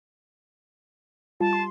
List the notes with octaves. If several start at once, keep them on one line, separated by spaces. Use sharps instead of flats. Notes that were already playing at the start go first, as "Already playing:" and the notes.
G3 F4 A5
C6